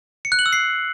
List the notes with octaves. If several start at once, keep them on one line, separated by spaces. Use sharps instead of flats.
C#7
F#6
F#7
E6
C7